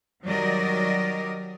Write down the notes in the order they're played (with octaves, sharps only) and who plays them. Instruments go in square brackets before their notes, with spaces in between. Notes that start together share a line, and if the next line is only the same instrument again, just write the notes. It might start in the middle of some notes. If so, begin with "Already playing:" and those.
[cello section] D#3 F#3 G3 A#4 D5 D#5